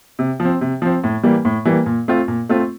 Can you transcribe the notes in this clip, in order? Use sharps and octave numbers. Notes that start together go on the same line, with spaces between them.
C3
F3
C4
C3
F3 C4
A2
E3 G3 A#3
A2
E3 G3 A#3
A#2
A3 C4 F4
A#2
A3 C4 F4